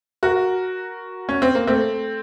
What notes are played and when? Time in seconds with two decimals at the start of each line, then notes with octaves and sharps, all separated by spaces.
0.23 F#4 A#4
1.29 C#4
1.42 C4
1.55 A#3
1.67 A3 C4